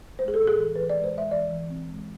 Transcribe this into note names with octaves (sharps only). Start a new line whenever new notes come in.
G#3 C5
G#4
A4
A2
G#4
E3
E3 B4
D5
G#3
C5
G#3 E5
E3 D5
E3
C4
G#3